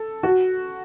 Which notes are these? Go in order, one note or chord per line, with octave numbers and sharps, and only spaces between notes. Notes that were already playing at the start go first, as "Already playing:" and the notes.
Already playing: A4
F#4